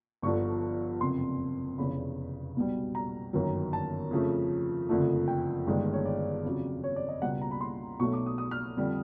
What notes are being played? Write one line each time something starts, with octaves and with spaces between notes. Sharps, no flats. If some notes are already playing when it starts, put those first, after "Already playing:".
G1 G2 D3 F3 C#6
F#1 F2 C3 C6
F1 E2 C#3 B5
B1 B2 G3
A#5
G1 F#2 D#3 F#3
A5
F2 C#3 F3 A3
F#1 F2 D3 F3 A3
G5
G1 G2 D#3 G#3
C#5
D5
F2 C#3 F#3
C#5
D5
D#5
C#2 B2 G3 F#5
A#5
B5
C6
B1 B2 F#3 A3 C#6
D6
D#6
D#6
F6
F2 D3 G3